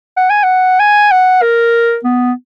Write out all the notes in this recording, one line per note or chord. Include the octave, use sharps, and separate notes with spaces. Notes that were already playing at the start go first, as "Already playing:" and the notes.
F#5
G#5
F#5
G#5
F#5
A#4
B3